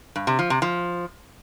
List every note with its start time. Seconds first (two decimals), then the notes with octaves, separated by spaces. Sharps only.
0.16 G2
0.27 C3
0.39 F3
0.50 C3
0.62 F3